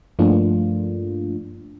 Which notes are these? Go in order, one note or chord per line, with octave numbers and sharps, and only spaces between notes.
G2 F3 A3 A#3 D4 F4